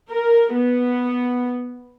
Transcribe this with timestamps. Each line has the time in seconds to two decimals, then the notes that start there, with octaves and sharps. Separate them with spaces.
0.11 A#4
0.55 B3